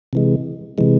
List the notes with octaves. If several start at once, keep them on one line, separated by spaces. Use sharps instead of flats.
C3 E3 G#3
C3 E3 G#3